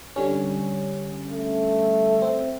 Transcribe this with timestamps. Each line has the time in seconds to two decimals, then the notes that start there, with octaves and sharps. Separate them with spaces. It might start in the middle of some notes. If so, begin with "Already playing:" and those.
0.16 D3 G3 C#4
1.32 A3
2.22 C4